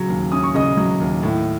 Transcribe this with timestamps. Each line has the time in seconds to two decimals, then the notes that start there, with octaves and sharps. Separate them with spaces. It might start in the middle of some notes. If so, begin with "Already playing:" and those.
Already playing: C#3 F#3 C#4
0.08 D#2
0.32 C#4 D#6
0.44 C#6
0.55 C#3 D#5 D#6
0.77 F#3
1.00 D#2
1.23 A2